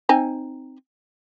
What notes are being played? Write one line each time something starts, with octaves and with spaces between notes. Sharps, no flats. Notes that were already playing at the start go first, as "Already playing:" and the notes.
C4 D#4 G#5